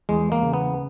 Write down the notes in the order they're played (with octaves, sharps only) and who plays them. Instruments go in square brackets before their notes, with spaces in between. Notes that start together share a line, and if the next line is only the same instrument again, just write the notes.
[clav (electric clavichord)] E2 G#3
A#3
C#3
B3